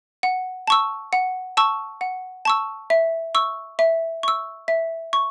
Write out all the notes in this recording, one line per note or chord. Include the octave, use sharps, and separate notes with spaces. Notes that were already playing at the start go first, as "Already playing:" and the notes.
F#5
A5 C#6 E6
F#5
A5 C#6 E6
F#5
A5 C#6 E6
E5
C#6 E6
E5
C#6 E6
E5
C#6